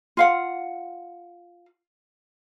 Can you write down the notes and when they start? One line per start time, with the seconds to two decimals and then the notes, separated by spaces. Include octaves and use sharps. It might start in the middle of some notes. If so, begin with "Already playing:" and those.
0.17 F4 F5 F#5